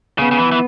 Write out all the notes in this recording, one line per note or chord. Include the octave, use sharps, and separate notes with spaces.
C#3 B3
C#3
E3
E3